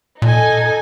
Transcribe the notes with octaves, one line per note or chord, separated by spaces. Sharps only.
A#2 D#4 A4 G#5